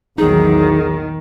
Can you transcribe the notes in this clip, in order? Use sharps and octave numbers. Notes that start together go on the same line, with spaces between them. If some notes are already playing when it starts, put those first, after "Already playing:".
A#1 E2 D#3 F#3 D#4 G#4